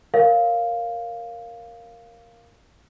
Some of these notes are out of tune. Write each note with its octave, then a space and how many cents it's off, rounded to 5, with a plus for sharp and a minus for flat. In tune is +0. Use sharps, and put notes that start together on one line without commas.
A#4 +0 C#5 -15 F5 +0